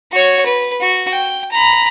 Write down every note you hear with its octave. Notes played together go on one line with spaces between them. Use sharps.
F#4 C#5
B4
F#4
G5
A#5 B5